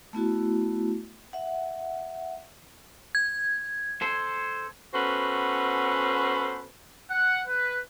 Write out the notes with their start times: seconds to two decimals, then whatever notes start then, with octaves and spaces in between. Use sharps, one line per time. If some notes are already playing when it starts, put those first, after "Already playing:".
0.13 A3 B3 E4 F#4
1.33 E5 F#5
3.15 G#6
4.02 A4 C5
4.94 B3 C#4 F#4 A4 B4 C5
7.09 F#5
7.47 B4